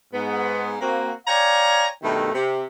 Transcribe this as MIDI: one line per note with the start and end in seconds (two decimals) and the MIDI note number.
0.13 0.74 44
0.13 0.74 59
0.81 1.11 58
0.81 1.11 60
0.81 1.11 66
1.27 1.87 73
1.27 1.87 74
1.27 1.87 77
1.27 1.87 79
1.27 1.87 80
1.27 1.87 82
2.02 2.32 43
2.02 2.32 47
2.02 2.32 51
2.02 2.32 57
2.34 2.64 48